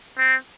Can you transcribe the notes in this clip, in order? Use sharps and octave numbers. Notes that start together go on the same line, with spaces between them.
C4